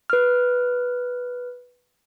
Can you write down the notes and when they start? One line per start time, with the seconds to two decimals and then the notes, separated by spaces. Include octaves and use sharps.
0.10 B4 F6